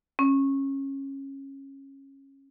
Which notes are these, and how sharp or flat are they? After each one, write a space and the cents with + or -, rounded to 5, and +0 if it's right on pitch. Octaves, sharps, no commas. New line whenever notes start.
C#4 -20